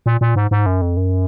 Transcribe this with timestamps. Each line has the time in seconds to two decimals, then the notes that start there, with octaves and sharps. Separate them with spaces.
0.06 A#2
0.21 A#2
0.36 G#2
0.51 G#2
0.66 F#2
0.82 F2
0.97 F#2